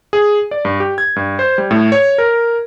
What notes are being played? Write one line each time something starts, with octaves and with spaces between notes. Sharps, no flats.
G#4
D5
G2
G4
G#6
G2
C5
G3
A2
C#5
A#4